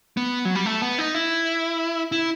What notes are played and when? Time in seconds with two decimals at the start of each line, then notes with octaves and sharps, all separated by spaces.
0.17 B3
0.45 F#3
0.55 G3
0.66 A3
0.82 B3
0.99 D#4
1.14 E4
2.12 E4